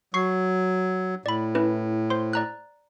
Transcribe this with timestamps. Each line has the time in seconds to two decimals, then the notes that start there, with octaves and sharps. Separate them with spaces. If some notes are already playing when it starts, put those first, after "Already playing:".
0.14 F#3 C#6 C7
1.26 A2 D5 B5
1.55 C#4 E4 B4
2.10 C5 C6
2.33 D5 A#5 F#6